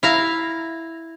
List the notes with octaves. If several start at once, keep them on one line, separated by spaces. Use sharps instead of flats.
E4 F5 A#5